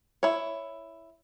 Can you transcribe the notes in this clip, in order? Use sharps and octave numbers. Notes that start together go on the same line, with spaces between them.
E4 C#5